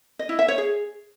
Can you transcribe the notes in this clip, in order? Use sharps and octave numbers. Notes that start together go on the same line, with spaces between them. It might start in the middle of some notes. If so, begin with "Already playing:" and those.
D#5
E4
E5
C#5
G#4